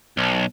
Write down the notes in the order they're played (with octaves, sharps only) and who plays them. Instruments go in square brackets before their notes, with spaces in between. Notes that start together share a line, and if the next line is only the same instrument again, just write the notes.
[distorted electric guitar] B1